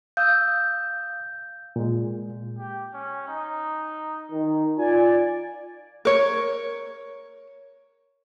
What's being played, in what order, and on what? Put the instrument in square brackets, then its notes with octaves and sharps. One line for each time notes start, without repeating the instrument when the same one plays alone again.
[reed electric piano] F5 D#6 E6 [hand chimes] G6
[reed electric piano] A#2 G#3
[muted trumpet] G4
C#4
D#4
[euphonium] D#3
[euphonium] F4 [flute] D5 [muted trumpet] G#5
[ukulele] A#4 C#5